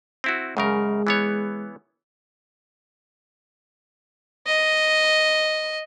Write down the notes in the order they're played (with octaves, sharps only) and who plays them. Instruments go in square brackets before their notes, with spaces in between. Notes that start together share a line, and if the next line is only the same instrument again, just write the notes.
[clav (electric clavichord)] C4 E4 F#4
[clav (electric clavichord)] F#2 C#3 A#4 [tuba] G#3
[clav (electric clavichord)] E3 B3 C#5
[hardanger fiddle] D#5